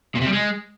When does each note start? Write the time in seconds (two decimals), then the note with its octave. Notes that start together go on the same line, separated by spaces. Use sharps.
0.15 A#2
0.21 C3
0.27 G3
0.32 G#3